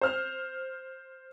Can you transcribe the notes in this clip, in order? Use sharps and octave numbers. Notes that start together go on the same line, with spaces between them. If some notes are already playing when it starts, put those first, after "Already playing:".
C5 F6